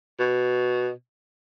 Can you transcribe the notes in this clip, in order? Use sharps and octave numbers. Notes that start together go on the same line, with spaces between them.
B2